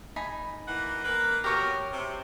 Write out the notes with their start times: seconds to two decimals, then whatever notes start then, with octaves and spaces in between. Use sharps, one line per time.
0.16 D#4 G#5 B5
0.68 E3 A#3 F#5
1.04 A#3 B4
1.44 B2 A#3 G4 A#4 C#5 C#6
1.92 C3